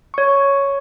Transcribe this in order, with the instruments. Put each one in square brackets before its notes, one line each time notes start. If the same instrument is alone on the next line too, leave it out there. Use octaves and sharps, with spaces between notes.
[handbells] C#5 C#6